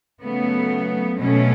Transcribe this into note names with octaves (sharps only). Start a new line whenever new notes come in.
C#3 F#3 A3 B3
B2 F#3 A3 C#4